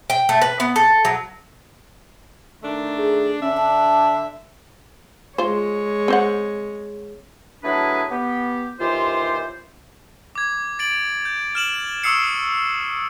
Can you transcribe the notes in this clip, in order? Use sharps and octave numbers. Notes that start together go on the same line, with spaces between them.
G5
A3
B4
B3
A4
F#3
D#3 A3 D4
G#4
D3 C#4 D4 E5
A5
G#3 F4 C5 C#5
C4 C5 F#5
F#3 A3 D4 E4 G#4 B4
B3 G4
D#2 E3 F4 G4 C5
D6 G#6
A6 D7 F#7
G6
F6 E7 F#7
C#6 D#6 E6 C7 C#7